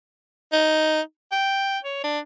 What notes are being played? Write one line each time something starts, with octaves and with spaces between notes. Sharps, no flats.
D#4
G5
C#5
D4